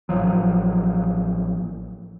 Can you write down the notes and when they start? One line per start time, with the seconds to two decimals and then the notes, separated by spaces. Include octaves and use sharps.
0.09 A1 F3 F#3